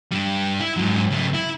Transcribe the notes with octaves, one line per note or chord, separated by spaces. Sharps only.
G2 G3
E4
G#2 F#3
C#3 A3
E4